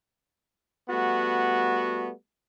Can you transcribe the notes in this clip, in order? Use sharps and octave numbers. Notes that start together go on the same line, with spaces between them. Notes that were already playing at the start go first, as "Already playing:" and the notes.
G3 A3 B3 F#4